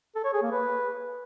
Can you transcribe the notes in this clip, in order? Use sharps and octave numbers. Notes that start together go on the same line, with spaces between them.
A4
C#5
G#4
A#3
B4